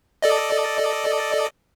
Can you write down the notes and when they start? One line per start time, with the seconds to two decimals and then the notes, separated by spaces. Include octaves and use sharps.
0.22 A4 D5 D#5